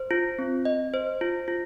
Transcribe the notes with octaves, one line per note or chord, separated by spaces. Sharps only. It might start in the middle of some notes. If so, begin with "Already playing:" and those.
Already playing: C5
F4
C4
D#5
C5
F4
F4